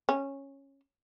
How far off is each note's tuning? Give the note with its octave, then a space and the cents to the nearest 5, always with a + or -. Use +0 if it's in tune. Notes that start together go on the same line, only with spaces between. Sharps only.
C#4 -10